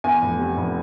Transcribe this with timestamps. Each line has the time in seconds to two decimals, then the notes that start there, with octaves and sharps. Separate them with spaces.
0.04 E2 G#5
0.22 F1
0.39 C3
0.57 F1